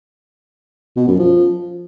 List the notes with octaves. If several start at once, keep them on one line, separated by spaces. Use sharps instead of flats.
B2
F#2
F3